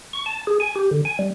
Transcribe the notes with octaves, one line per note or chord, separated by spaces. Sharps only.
C#6
A5
G#4
G#5
G4
D3
G#5
G3